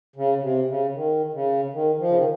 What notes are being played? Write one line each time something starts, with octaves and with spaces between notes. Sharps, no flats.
C#3
C3
C#3
D#3
C#3
D#3
F3
C#3
D#3